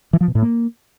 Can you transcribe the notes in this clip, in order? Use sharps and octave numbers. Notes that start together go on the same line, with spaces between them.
E3
F3
B2
A2
A#3